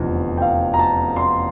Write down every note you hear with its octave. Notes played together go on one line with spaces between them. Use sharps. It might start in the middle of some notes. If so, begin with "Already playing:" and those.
Already playing: F1 E2 D3 F3
G5
F5
A#5
A5
C6